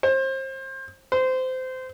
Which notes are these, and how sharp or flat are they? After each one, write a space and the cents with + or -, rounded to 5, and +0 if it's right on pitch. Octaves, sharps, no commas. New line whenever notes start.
C5 +30
C5 -20